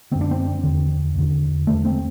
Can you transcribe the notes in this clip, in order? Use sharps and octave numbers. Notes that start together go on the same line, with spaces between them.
F#2 D3 C4
D4
C4
E2 D3
E2 D3
E2 D3 A3
C4